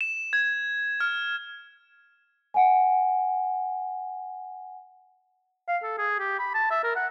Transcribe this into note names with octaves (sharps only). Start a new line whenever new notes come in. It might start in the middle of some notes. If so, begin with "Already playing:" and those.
E7
G#6
F6
F#5 G#5
F5
A4
G#4
G4
B5
A5
E5
A#4
F#5